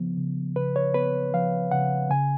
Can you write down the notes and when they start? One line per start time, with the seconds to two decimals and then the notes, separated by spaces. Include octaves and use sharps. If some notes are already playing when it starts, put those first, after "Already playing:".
Already playing: C#3 F3 B3
0.17 C#3
0.56 C#3 B4
0.76 C#5
0.94 B3 B4
1.34 F3 F5
1.71 C#3 F#5
2.10 C#3 G#5